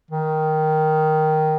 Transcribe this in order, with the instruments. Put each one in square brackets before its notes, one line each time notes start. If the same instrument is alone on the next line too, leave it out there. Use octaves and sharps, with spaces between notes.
[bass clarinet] D#3